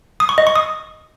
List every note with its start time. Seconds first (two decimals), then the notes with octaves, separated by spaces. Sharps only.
0.20 D#6
0.29 C#6
0.38 D#5
0.47 C#6
0.55 D#6